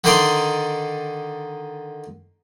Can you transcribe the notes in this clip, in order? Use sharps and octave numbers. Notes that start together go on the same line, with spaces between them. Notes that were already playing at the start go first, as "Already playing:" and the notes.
D3 D#3 D#4 C5 D5 C6